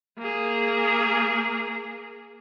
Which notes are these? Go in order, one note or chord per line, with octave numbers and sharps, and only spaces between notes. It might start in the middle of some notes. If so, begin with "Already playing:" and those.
A#3 G#4